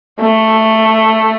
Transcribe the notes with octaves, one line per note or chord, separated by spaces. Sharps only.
A3